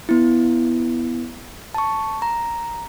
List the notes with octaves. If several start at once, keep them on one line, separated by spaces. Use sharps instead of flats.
B3 E4
A5 C#6
A#5